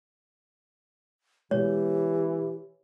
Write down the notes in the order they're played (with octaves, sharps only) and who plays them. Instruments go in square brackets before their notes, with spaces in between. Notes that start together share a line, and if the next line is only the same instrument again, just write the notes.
[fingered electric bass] B2 G#3 [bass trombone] E3 [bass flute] G4 [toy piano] C#5